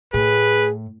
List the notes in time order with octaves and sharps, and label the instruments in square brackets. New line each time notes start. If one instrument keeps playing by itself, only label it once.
[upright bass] A2 [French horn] G#4 [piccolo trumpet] B4